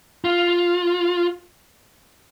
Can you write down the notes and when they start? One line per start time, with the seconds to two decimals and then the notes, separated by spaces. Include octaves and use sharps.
0.25 F4